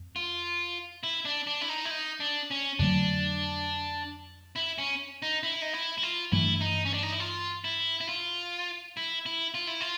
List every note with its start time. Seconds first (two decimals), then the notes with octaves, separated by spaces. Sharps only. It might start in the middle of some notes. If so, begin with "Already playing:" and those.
Already playing: F2
0.16 F4
1.03 E4
1.25 D4
1.47 D4
1.61 E4
1.69 D#4
1.85 E4
1.91 D#4
2.20 D4
2.51 C#4
2.79 F2 D3 F#3 A3 D4
4.56 E4
4.78 C#4
5.22 D#4
5.43 E4
5.62 D#4
5.73 E4
5.98 E4
6.03 F4
6.32 G2 E3 A3 E4
6.61 D#4
6.85 C#4
6.94 D4
7.03 D#4
7.12 E4
7.20 F4
7.64 E4
8.01 E4
8.09 F4
8.97 E4
9.26 E4
9.54 F4
9.67 E4
9.81 F4